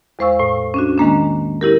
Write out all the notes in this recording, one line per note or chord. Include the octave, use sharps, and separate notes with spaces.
E2 G#3 C5 F5 C#6 E6
A2
C#4 D4 F#4
D#3 G#3 A#3 D4
C#4 E4 G4 A#4